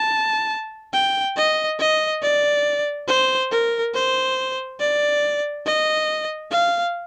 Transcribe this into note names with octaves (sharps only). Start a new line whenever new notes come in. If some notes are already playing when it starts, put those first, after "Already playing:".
Already playing: A5
G5
D#5
D#5
D5
C5
A#4
C5
D5
D#5
F5